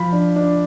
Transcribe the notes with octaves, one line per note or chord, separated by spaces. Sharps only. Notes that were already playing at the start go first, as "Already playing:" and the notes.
Already playing: F3 B5
D4
D4